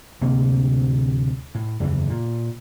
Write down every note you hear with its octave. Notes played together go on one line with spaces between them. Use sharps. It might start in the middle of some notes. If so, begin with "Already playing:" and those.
D1 D2 C3 A#3
A2
F#1 E2 D#3 E3
A#2